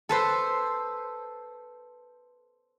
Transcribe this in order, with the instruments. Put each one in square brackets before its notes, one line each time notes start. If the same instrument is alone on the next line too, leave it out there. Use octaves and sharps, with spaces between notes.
[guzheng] A4 B4 C5